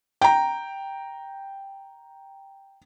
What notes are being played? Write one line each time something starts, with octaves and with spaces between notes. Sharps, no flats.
G5 A#5